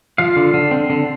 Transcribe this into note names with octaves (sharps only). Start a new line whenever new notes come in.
F3 F5
D3
D3
C4
D3